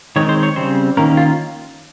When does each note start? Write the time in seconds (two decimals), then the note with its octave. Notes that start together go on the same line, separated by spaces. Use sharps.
0.16 D#3 G#3 C4 C#5
0.29 C5
0.43 C#5
0.56 C#3 G3 C4 C5
0.97 D#3 A#3 C#4 A#4
1.17 F4